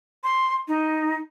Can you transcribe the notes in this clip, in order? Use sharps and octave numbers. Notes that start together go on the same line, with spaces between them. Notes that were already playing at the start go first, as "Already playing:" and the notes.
C6
D#4